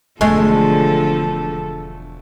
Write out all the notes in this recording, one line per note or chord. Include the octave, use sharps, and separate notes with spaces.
E1 D3 F3 G#3 A3 A4